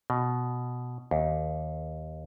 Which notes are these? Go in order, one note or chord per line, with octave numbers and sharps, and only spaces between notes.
B2
D#2